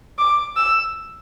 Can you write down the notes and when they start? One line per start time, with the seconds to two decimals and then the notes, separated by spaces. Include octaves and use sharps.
0.18 D6
0.57 E6